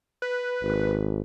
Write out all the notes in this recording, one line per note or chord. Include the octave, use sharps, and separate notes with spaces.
B4
G#1